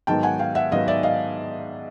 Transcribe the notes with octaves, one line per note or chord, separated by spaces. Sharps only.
G#2 D#3 F#3 B3 G5 A5
F#5 G#5
F5 G5
E5 F#5
G#2 D#3 F#3 B3 D#5 F5
D5 E5
D#5 F5